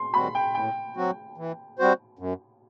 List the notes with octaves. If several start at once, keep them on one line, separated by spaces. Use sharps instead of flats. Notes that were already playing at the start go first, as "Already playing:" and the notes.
Already playing: C6
D#3 G3 C4 F#4 B5
G5
A2 G5
F#3 C4 F#4
E3
G3 C4 F#4 C5
F#2